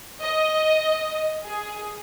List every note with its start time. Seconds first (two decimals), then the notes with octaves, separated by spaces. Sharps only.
0.22 D#5
1.45 G#4